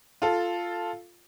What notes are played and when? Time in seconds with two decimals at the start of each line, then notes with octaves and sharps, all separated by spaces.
0.22 F4 A4